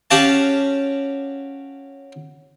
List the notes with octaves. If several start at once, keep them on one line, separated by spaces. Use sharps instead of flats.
C#4 F#4 G4 F5 F#5 A5